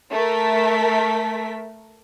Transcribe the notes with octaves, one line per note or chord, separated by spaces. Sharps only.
A3 A#4 B6